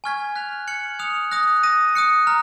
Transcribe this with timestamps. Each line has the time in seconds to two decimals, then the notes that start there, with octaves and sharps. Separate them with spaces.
0.04 G#5 C#6 F6 G#6 B6
0.36 F#6 B6 F7
0.67 F6 G#6 C#7 F#7
0.99 D#6 F#6 C#7 F7
1.31 D#6 F#6 A#6
1.63 D#6 A#6 D#7
1.95 D#6 F#6 C#7
2.27 A#5 F6